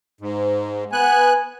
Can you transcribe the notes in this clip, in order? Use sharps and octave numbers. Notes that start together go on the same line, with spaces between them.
G#2
B3 G#5 F#6